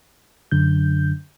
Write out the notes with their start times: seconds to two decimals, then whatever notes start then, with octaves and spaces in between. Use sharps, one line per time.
0.51 F#2 D3 G6